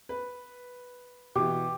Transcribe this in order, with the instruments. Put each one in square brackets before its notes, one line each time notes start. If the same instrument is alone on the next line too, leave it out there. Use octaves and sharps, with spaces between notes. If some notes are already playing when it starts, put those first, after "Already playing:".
[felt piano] B4
[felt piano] B2 E3 [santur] G4